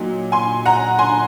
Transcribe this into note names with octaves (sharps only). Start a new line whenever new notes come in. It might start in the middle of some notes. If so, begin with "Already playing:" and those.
Already playing: A#2 F#3 D#4
G#5 C6
F#5 A#5
G#5 C6